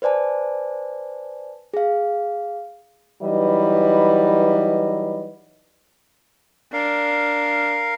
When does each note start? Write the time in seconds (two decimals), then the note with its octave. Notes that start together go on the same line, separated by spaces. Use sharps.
0.02 B4 C5 D5 G#5 A5
1.74 G#4 F5
3.22 E3 F#3 G3 D#4 B4 D#5
6.73 D4 A#4 F5